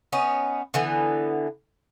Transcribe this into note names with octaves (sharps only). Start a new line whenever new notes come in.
B3 C#4 D#4
D3 E3 B3